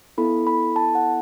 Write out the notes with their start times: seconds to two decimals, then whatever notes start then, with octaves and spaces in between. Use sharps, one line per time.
0.18 B3 E4 A4 B5
0.47 B5
0.76 A5
0.95 F#5